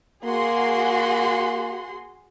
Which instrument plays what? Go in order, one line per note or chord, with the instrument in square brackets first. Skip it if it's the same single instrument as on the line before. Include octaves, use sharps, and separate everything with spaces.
[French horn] A#3 [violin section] F#4 G#4 C6